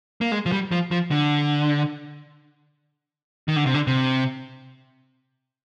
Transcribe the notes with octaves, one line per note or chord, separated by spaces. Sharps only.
A#3
G#3
F3
G3
F3
F3
D3
D#3
D3
C3
D3
C3